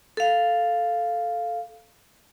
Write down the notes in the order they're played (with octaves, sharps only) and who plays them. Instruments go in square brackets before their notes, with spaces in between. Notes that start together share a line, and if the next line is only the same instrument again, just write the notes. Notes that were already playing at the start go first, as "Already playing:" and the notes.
[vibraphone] A4 F5